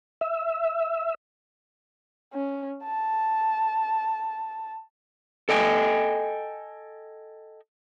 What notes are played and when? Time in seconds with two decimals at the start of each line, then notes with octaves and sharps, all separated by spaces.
0.21 E5
2.33 C#4
2.84 A5
5.49 A4 D#5 G5 G#5